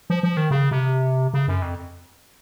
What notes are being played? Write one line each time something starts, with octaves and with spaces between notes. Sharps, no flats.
F3
F3
D#3
C#3
C3
C#3
F#2
F2